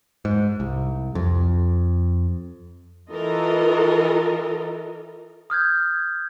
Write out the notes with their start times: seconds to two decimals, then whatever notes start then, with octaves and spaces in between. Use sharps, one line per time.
0.25 G#2
0.60 C2
1.15 F2
3.10 E3 F4 A4 A#4 D#5
5.50 D#6 F6 G6 G#6